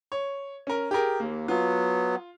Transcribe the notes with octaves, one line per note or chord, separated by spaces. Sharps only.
C#5
C#4 A#4
G4 G#4 A#4
D#2 A#3
F#3 B3 F4